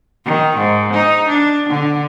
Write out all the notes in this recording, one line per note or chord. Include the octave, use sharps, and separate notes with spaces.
D#3
G#2
D#4
D4
D3